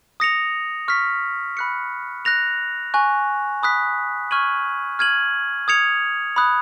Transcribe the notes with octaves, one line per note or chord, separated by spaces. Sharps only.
D#6 A#6 C#7 F7
C#6 F6 B6
B5 F#6 C#7
F#6 A#6 F7
G#5 C#6 F#6
B5 D#6 F#6 B6
C#6 F6 G#6 D#7 F#7
F6 G#6 D#7 F#7
D#6 G#6 C#7 F7
B5 D#6 F#6